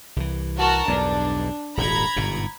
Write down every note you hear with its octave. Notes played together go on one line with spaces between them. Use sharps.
C2 E3
F#4 A#4 A5
B1 E2 G2 D4
D#1 G#1 A#2 A#5 B5 G#6
G1 G#2 B2